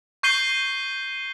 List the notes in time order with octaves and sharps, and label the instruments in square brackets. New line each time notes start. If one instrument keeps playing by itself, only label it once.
[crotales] C#6 G6 C7 D#7 G7